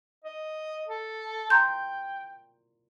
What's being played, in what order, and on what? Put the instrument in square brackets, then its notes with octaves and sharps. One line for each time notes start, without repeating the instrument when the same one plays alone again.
[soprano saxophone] D#5
A4
[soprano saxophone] G5 [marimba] A#5 C6 G6